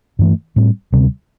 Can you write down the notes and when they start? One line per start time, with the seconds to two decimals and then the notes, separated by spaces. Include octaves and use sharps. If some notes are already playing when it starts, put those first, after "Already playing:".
0.19 G2 E3 A3
0.56 A2 G3 C4
0.92 D2 C3 G3